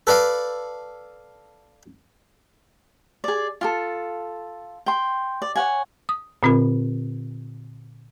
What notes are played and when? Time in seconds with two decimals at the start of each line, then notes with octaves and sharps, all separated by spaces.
0.07 A4 B4 D5 F5
3.24 G#4 D5
3.61 F4 G4 A4
4.86 G5 C6
5.42 D5
5.56 C#5 F#5 G#5
6.09 D#6
6.43 A#2 D3 C4 F4 A#4 B5